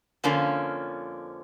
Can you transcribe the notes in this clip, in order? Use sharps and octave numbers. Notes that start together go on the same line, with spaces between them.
F2 D3 F3 A#3 C#4